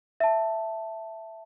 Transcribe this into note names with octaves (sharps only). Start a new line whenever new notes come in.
E5 A5